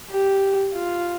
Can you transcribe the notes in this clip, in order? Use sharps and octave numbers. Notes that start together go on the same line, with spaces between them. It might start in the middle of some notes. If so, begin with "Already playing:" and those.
G4
F4